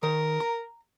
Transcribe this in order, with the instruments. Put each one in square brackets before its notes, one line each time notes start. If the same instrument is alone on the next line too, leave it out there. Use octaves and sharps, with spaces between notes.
[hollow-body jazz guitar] D#3 [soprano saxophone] A#4
[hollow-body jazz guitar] A#5